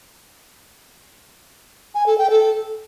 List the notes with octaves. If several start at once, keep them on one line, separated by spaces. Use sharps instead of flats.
G#5
A4
G5
A4